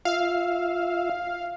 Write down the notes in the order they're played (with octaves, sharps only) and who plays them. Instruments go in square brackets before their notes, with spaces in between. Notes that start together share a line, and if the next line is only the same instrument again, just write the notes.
[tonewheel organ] F4 E5 [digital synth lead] F5